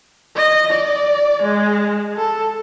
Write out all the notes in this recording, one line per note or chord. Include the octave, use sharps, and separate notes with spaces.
D#5
D5
G#3
A4